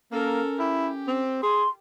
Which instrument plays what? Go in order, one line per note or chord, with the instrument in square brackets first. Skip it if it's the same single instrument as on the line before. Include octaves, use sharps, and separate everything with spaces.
[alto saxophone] A#3 [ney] C#4 [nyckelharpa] A4 A#4
[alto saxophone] E4 [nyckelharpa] G4
[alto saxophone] C4
[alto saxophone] G#4 [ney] C6